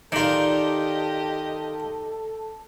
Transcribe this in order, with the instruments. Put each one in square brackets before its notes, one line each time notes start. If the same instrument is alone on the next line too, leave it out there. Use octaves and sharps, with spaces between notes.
[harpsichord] D#3 F4 [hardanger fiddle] G4 D#5 [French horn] A4 [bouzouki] D5 A#5